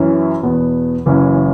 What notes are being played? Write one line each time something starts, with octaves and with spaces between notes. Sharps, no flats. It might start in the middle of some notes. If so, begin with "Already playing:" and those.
Already playing: F#2 E3 C#4 E4
E2 B2 B3
F#1 F#2 E3 C#4